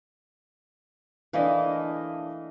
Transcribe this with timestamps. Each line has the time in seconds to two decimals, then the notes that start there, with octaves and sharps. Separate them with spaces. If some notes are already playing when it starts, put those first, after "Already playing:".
1.33 E3 A3 A#3 D4 D#5 F5